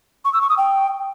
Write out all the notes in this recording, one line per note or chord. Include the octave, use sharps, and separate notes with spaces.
C#6
E6
C#6
D#6
G5